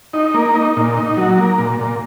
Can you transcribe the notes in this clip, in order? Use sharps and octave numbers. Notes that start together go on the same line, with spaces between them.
D#4
A#3
D#4
A#2
D#4
F#3
A#3
A#2
A#2